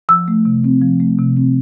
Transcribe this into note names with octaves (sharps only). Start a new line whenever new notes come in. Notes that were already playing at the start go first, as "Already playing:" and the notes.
F3 E6
A3
C3
C4
F3
A3
C3
C4